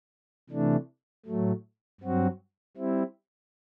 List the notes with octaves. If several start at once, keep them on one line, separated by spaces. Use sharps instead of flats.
C3 E3 A3 D4
A2 F#3 A3
G2 F#3 C4 F#4
G3 C4 E4